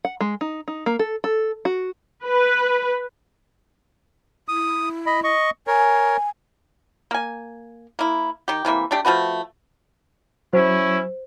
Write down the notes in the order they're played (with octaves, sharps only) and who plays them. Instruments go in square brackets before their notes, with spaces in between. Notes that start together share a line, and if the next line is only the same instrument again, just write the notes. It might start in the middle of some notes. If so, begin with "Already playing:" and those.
[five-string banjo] F#5
G#3
D#4
D#4
A#3
A4
A4
F#4
[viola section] B4
[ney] E4 [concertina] D#6
[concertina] D#5 B5
D#5 C#6
[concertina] A#4 C#5 [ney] G#5
[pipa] A#3 G#5
A#3 E4
D#3 G4
C3 E3 A#3 E5
A3 D4 G4
F3 A3 F#4 B4
[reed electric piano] F#3 [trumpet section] C#4 E4 [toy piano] C5